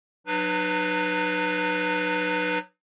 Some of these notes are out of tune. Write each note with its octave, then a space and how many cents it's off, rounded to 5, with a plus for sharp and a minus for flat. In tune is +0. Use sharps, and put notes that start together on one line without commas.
F#3 -20 D#4 -45 B4 +0